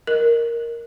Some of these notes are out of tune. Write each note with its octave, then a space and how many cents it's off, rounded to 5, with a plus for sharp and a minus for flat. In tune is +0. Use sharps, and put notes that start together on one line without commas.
A#4 +0 D#5 +0